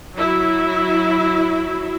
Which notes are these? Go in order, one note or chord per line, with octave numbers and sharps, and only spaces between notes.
F#3 E4